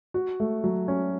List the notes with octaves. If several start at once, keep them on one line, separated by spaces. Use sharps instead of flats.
F#4
A3
F#3
C#4